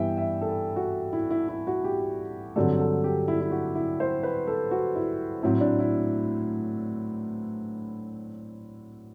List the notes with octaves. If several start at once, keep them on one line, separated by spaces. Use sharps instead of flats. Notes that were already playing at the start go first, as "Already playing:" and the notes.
Already playing: G2 E3 B3 E5 G5
E5
A4
F#4
E4
E4
E4
F#4
G4
G2 D3 F#3 C4 A4
A4
G4
E4
E4
F#4
E4
C5
B4
A4
F#4
E4
A2 F#3 C4 E4
D4
E4